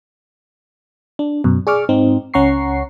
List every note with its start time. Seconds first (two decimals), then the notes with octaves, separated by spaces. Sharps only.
1.19 D4
1.44 F#2 B2
1.67 G#4 D5 C#6 D6 F6
1.89 G#2 C4 D#4
2.34 C#2 C#4 F#5 A#5 C#6 C7